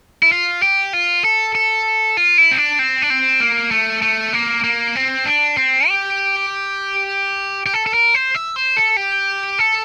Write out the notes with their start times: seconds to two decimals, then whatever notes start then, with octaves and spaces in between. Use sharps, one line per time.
0.23 E4
0.32 F4
0.62 G4
0.93 F4
1.24 A4
1.55 A4
2.17 F4
2.38 E4
2.51 C4
2.58 D4
2.79 C4
3.02 D4
3.10 C4
3.40 A#3
3.71 A3
4.02 A3
4.33 A#3
4.64 A#3
4.96 C4
5.26 D4
5.57 C4
5.88 G4
7.66 G4
7.74 A4
7.86 A4
7.94 A#4
8.14 C5
8.35 E5
8.56 C5
8.77 A4
8.97 G4
9.59 A4